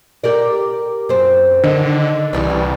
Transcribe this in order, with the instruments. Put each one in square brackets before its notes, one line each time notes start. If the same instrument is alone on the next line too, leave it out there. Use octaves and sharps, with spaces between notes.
[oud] G4 A#4 D5
F#2 C4
[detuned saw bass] D3 [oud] D#3
[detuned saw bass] C2 [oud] C#3 E3 G3